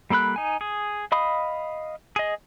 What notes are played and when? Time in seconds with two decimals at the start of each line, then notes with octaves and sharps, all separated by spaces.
0.10 G3 A#3 A4 B5 F#6
0.36 D#4 G#5
0.61 G#4
1.12 D#5 F5 B5 D#6
2.16 G#4 D#5